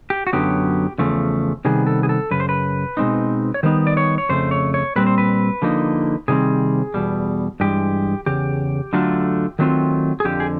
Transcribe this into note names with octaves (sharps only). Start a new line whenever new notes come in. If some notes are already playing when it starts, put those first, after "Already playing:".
G4
F#4
F#2 D3 F#3 B3 G4
E2 C#3 F3 A3
C3 D#3 G3 B3 G#4
A4
G#4
A4
F#2 C#3 B4
C5
B4
B2 G#3 C4 D#4
C#5
D#3 G3 B3 D#4 C5
D5
C#5
C#5
F2 C#3 A3 C5
C#5
C#5
A#2 G3 C4 B4
C5
B4
D3 F3 A#3 D#4
C3 D#3 G3 C4 G#4
E2 B2 G3
G2 E3 G#3 G4
E2 C#3 G4
D3 F#3 A3 D4 F4
D#3 F#3 A3 C4 F4
G#4
F2 D3 F3 G4
G#4